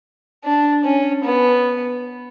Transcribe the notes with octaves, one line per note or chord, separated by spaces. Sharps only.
D4
C#4
B3